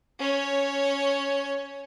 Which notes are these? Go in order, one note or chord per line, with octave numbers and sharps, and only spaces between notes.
C#4 C#5